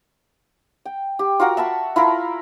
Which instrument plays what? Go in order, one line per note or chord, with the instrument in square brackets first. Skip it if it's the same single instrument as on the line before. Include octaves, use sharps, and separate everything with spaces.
[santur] G5
G4
F4 F#4 A#4 F#5
E5 A5 B5 C#6
E4 F4 A4 A#4